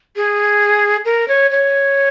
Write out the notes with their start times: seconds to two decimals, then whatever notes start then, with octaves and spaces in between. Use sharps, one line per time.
0.16 G#4
1.05 A#4
1.28 C#5
1.51 C#5